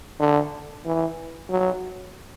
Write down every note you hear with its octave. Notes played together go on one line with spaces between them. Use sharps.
D3
E3
F#3